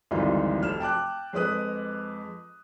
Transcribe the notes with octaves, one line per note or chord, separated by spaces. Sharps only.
G#1 D2 E3 G3 D#4 F4
F1 F6 E7
G5 A5 D6 F#6
F2 G#3 B4 D#6 F#6